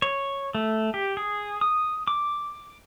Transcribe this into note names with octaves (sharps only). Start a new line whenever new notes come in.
C#5
A3
G4
G#4
D#6
D6